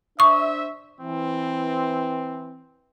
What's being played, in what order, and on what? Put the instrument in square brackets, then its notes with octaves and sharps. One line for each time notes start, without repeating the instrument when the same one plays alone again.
[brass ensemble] D4 C5 E5 [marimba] C#6 D#6
[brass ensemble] E3 C4